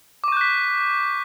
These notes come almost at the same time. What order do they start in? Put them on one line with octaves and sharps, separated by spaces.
D6 C#6 G6 F#6 B6